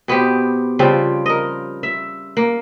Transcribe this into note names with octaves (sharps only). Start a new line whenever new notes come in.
B2 B3 C4 G4
C#3 F3 G3 C4
A#4 D#5
E5
A#3